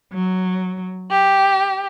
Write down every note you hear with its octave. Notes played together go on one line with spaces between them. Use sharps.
F#3
G4